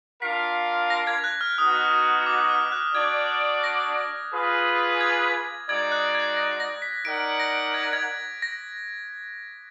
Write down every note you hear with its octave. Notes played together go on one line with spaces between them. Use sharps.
D4 F4 A#4 F5 B6
A#6
G#6
G#6
F#6
F6
B3 D#4 F#4 D#6
D6
F6
F#6
D4 F#4 D5 G#6
A#6
F4 G#4 B4
G#6
G#3 D#4 F#4 D5 G#6
F#6
G#6
A#6
A#6
B6
D#4 A#4 D5 F#5 D7
A#6
G#6
A#6
G#6
A#6